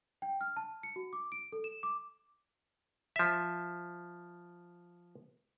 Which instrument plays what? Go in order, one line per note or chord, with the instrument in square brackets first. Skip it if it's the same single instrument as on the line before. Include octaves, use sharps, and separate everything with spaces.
[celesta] G5
F6
A5
C#7
F#4
D6
D7
A4
E7
D6
[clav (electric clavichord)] F3 E5